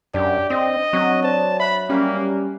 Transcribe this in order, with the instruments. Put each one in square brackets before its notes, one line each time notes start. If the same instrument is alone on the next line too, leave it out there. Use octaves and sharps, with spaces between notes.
[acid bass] F#2 [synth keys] D4 [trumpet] G4 [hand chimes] D5
[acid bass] C4 [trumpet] D#5
[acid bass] F#3 [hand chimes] C4 C#6 F#6
[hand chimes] F#4 C5 D5 [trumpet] A5
[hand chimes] E5 F#6 [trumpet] B5
[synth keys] G3 C#4 G4 [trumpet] A#3